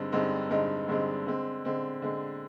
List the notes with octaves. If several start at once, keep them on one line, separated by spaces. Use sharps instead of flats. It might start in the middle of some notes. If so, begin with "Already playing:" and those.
Already playing: G2 D3 G#3 C4 D#4
G2 D3 G#3 C4 D#4
G2 D3 G#3 C4 D#4
G2 D3 G#3 C4 D#4
D3 G#3 C4
D3 G#3 C4
D3 G#3 C4